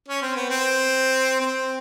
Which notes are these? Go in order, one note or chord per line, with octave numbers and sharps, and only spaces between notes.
C#4
C4
B3
C4
C4